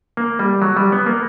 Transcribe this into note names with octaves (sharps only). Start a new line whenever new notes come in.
A#3
G3
F#3
G3
B3
A#3